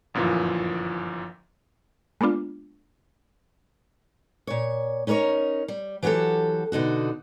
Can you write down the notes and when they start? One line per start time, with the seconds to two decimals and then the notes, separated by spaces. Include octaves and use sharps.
0.14 G1 F#2 A#2 E3 F3
2.21 G#3 A#3 B3 D4 F4
4.47 A#2 C#5
5.07 C#4 D#4 A#4 B4 C#5
5.68 G3
6.03 E3 F#3 F#4 G4 A4
6.72 B2 D3 D#4 F#4